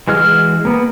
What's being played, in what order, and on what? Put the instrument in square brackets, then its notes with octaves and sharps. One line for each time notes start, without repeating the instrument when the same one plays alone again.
[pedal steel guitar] E3 G#3 F#4 G#4 F6
A#3 B3